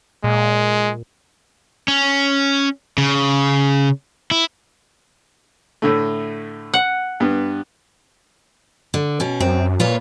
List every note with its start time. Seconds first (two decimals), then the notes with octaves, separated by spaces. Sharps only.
0.24 A#2 G#3
1.88 C#4
2.98 C#3
4.31 E4
5.82 A2 D3 A3
6.74 F#5
7.20 G2 B3
8.94 D3
9.20 B2 C#4
9.40 F#2 C4
9.80 A#2 F4 B4 C#5